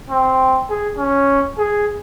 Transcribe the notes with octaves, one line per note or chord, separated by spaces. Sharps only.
C4
G#4
C#4
G#4